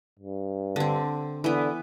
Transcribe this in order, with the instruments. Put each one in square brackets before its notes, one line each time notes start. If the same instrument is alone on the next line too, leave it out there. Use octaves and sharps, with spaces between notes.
[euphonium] G2
[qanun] D3 C4
[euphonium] D3 [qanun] E3 B3